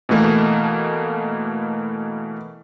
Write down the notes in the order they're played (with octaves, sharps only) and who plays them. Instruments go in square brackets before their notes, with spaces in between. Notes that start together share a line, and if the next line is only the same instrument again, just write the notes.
[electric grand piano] B2 E3 A3 A#3